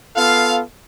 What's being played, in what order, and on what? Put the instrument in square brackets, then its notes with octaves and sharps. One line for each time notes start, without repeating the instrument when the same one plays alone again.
[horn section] B3 F4 A4 F5